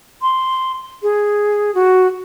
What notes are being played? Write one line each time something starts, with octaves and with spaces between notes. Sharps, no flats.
C6
G#4
F#4